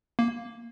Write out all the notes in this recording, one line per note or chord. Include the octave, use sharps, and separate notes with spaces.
A#3